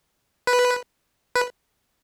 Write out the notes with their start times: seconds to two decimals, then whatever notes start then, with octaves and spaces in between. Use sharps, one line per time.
0.47 B4
1.36 B4